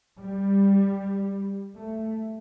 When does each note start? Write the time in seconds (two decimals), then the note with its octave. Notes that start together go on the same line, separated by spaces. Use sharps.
0.20 G3
1.76 A3